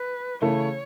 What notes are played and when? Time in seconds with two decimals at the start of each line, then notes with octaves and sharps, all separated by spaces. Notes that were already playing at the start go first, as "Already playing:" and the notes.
Already playing: B4
0.42 C#3 E3 A3 E4 A4 C#5